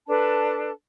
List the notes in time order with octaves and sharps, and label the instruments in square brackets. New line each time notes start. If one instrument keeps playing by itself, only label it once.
[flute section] D4 A4 B4 A5